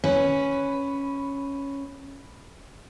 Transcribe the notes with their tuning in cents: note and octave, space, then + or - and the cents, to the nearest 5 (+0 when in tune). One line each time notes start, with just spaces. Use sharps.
C#4 +0 B4 +0